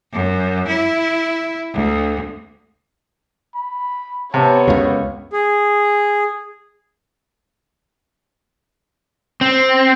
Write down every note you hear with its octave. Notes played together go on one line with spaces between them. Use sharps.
F#2
E4
D2
B5
C3 B3 C#5 A5
C#2 F#2 C#3 F5
G#4
C4